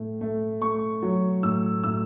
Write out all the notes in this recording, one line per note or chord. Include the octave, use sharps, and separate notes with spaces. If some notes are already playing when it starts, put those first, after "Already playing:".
Already playing: A2 A3
A3
A3 C#6
F#3
A2 E6
A2 E6